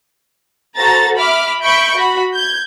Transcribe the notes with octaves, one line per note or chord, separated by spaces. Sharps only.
F#4 A4 C5 A#5 A6
E5 B5 D6 F6
E5 B5 C#6 G6 D7
F#4 B5
G6 G#6